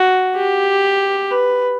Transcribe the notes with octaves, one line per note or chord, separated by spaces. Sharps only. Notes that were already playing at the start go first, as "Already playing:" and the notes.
Already playing: F#4
G4
B4